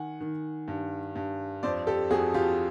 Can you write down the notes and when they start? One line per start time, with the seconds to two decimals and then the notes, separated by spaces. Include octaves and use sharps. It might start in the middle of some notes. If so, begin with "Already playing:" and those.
Already playing: D#3 F#5 G#5
0.21 D#3
0.68 G2
1.15 G2
1.63 F2 C5 D5
1.87 G4 A4
2.10 F2 F#4 G#4
2.34 F4 G4